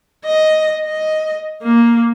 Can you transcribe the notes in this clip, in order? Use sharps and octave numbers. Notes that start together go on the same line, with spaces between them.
D#5
D#5
A#3